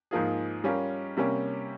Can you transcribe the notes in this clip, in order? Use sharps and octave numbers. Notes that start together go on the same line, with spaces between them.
G#2 F3 A#3 F4 G#4
G3 C#4 F4 A#4
C3 G3 A#3 C#4